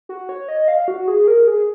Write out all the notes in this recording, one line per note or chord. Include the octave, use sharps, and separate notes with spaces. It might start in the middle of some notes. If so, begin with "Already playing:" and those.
F#4
C#5
D#5
F5
F#4
G#4
A#4
G#4